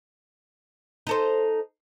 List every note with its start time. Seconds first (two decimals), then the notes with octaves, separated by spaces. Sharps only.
1.07 D#4 A4 C5